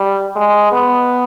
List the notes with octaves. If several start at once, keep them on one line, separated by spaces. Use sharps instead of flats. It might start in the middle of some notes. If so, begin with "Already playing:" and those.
Already playing: G3
G#3
B3